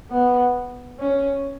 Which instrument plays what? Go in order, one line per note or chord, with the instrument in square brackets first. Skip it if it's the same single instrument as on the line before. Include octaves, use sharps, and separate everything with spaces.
[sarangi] B3
C#4